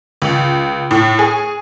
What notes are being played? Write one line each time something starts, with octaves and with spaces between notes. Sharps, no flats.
C#2
A2
G#4